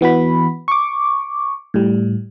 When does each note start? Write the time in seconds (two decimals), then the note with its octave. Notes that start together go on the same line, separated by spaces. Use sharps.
0.01 E3 B3 F#4 B5
0.68 C#6 D6
1.74 A2 G3